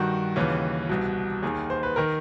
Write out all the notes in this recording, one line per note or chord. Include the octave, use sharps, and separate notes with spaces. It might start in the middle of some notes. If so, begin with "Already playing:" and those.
Already playing: G2 D#3 F#4
D#2 C#3 E3
C2 B2
D#2 D#3 G#4
C5
B4
D#3 A#4